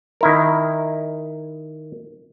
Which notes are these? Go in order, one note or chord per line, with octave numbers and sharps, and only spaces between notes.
D#3 E4 A#4